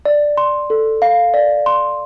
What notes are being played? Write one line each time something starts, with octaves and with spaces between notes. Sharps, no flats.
D5
C6
A4
F5
D5
C6